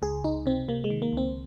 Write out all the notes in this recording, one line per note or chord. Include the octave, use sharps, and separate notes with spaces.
C#2 G#4
C#2 D#4
C3 C4
C3 A#3
G#3
D#3
A#3
C#2 C4